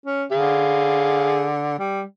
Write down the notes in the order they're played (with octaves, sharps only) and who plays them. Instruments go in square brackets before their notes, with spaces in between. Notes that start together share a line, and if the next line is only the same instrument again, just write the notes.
[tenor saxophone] C#4
[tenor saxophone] D3 [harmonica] G#4 F5
[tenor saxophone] G3